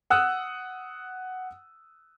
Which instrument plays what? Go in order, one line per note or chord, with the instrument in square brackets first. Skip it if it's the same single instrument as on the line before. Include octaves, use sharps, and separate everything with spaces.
[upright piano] F#5 D#6 E6 F#6